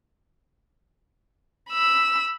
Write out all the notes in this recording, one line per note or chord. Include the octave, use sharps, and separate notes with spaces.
B5 E6